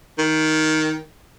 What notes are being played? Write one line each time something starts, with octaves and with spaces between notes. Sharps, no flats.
D#3